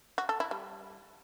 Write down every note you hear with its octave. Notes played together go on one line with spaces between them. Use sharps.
F#4
A4
E4
G3